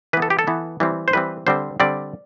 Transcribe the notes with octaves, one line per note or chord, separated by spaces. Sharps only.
E3 B3 B4
A4
G4
A4
E3 B3
E3 G3 C4
C5
E3 G3 C4 B4
D3 G3 C4 C5
D3 G3 C4 D5